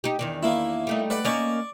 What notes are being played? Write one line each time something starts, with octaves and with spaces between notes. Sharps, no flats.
D#4 G4
E2 D#3 D4
A#3 E4
G3 A3 D#4
B4 D5 F#5
A#3 C#4 D#4 D5 C#6